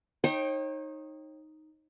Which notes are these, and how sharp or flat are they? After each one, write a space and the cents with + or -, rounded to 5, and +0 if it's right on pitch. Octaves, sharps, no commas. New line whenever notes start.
D#4 +0 C#5 -40 G5 +0